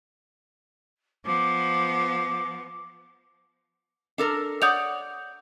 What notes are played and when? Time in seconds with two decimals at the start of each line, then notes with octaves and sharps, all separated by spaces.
1.25 F3 B3 D6
4.18 D4 A4 A#4
4.62 C#5 D5 F#5 D#6 G6 F7